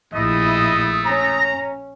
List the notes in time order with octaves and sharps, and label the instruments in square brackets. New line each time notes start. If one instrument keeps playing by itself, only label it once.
[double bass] A#1 E4 [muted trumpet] A3 [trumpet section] D#5 [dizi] D#6
[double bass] C#4 [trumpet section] A#5